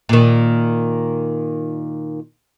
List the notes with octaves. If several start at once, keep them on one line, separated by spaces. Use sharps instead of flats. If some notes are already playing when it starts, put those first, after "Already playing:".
A#2 D#3